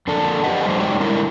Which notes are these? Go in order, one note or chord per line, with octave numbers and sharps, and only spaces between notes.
F2 A#3 D4 A4 A5
G4 G#4 B4 D5 D#5 F#5
F2 G3 A3 D#4 C5
G#3 D#4 F#4 C#5 D5 G5
D3 G3 G#3 D4 E4 A#4